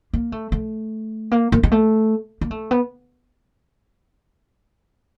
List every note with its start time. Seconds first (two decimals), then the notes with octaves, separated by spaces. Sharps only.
0.13 A#3
0.32 A3
0.52 A3
1.31 A#3
1.52 A#3
1.63 G#3
1.72 A3
2.41 A#3
2.51 A3
2.71 B3